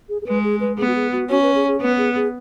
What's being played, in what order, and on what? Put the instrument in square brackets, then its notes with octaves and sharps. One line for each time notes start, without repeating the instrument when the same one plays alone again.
[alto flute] G#4
G#4
[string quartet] G#3 [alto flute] B4
[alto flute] G#4
B4
[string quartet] B3 [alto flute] G#4
[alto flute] F#4
G#4
F#4
[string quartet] C#4 [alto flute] F#4
[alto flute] B4
G#4
G#4
[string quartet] B3 [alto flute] B4
[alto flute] G#4
G#4